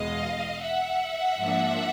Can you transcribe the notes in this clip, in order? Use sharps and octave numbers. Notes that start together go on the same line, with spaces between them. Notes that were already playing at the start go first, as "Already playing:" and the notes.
Already playing: E2 B2 G#3 D#5 F5
E5 F#5
G#2 F3 A#3 D4